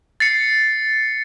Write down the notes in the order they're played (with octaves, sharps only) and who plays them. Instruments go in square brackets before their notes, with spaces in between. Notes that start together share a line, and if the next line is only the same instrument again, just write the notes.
[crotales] A6 C7 C#7